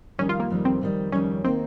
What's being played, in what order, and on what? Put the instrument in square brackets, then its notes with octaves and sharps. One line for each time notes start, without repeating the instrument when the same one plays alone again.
[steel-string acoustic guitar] F2 D#3 G3 [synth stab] C#4
[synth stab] F4
A#3
[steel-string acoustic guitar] F2 D#3 G3
[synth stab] C4
[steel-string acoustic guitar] F2 D#3 G3
[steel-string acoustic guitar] F2 D#3 G3 [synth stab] C#4
[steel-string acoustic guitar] D#3 A#3 D#4 [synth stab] C4